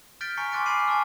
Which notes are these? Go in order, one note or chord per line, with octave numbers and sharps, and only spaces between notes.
F6 G6 A6 B6 D7 G7
G#5 A#5 C#6 B6 C#7 G7
G#5 C6 D6 F#6 A6 D7
G#5 B5 D6 F6 C7 D#7
G#5 A5 C#6 E6